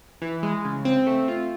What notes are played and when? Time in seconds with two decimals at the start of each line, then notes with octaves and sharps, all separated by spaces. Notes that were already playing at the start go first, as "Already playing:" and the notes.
0.22 E3
0.43 G#3
0.65 C#3
0.85 C4
1.07 A3
1.28 F4